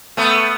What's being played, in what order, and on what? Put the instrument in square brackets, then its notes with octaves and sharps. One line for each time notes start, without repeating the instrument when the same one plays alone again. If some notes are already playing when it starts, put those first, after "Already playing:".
[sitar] A3 B3